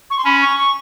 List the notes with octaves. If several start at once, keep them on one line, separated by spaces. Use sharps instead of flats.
C#6
C6
C#4 B5
C#6
C#6